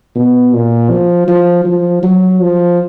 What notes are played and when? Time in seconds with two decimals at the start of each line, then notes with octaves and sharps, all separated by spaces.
0.16 B2
0.53 A#2
0.90 F3
1.28 F3
1.66 F3
2.03 F#3
2.41 F3